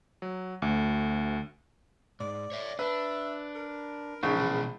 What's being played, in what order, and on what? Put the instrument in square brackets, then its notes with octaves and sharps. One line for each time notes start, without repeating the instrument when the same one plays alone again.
[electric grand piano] F#3
D2
[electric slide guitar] G#2 [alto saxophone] D5
[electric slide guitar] C#5 E5
[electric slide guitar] D4 [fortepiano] B4 [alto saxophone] E5
[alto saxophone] A#4
[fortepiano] A#1 C#3 [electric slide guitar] D#4
[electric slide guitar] B2 E3 G#3